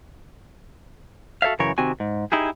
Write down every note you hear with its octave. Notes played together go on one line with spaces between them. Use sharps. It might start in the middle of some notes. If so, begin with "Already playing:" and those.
F#4 A4 C#5 E5 F5
F#2 C#3 E3 A#4 C#5
C3 D#3 C4 F#4 G#5
G#2
D#4 E4 G4 G#4